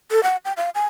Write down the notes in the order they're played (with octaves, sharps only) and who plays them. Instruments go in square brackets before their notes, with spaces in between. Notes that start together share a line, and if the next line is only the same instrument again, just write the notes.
[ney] A4
F#5
G5
F5
G#5